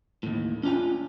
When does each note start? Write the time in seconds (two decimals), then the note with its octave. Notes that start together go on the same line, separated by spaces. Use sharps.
0.23 D#2 A2
0.63 C#4 D4 F4 G5 G#5